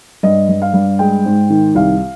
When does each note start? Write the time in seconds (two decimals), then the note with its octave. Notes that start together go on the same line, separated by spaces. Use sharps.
0.23 G2 D#5
0.49 G2
0.62 F5
0.74 G2
0.99 G#3 G5
1.26 G#2
1.50 D#3
1.75 C2 F5